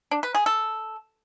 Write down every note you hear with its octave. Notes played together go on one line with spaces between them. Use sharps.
D4
B4
G#4
A4